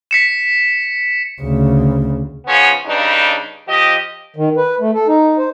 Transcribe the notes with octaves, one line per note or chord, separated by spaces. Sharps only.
B6 C#7 E7
D2 C#3
C#3 F3 B3 C#4
G2 C#3 D4 D#4
F3 G4 D#5
D#3
B4
A3
A4
D#4
C5